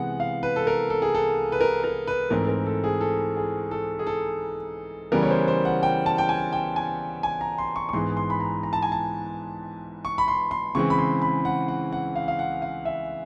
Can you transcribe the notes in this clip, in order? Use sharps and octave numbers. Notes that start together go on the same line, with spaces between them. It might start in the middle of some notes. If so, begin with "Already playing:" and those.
Already playing: C3 E3 G#3 B3 F#5
F5
B4
A4
A#4
A4
G#4
A4
B4
A#4
A#4
B4
G#2 E3 A3 C4 A#4
A#4
A4
G#4
A4
G#4
A4
G#4
A4
C#3 E3 G3 B3 A#4
C#5
C5
C5
F#5
G5
A5
G5
G#5
G5
G#5
G#5
A#5
C6
C#6
C#6
G#2 E3 G#3 B3 C6
C6
B5
A#5
A#5
A5
G#5
A5
C#6
B5
C6
C6
C#3 E3 G#3 C4 C#6
B5
C6
B5
F#5
F#5
F#5
F5
F5
F#5
F5
E5